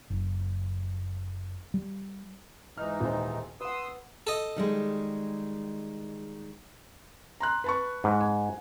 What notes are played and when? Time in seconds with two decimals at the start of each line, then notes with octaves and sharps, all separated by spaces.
0.10 F#1
1.74 G3
2.78 G#2 E3 D#4 F6
3.01 D#1 C5
3.61 B4 F#5 C6 D#6 E6
4.27 A4 D#5
4.56 D#3 G3 G#3
7.40 A#5 C6 F#6
7.64 B4 A5 C#6
8.04 G#2
8.20 G#5